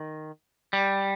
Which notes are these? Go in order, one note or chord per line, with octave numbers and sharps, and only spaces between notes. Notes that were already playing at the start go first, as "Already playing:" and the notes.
Already playing: D#3
G3